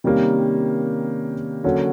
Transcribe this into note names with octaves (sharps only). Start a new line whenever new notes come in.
C3 D#3 G3 A#3 C#4
D3 F#3 A#3 C#4 F#4